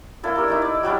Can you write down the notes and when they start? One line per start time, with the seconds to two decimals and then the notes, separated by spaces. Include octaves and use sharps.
0.23 A#3 D4 E4 A4
0.36 D4 G4 A#4
0.48 A3 D#4 E4
0.62 D5
0.83 F#3 G3 D4 E4